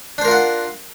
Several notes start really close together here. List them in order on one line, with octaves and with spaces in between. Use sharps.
D4 C5 A#4 F4 F#5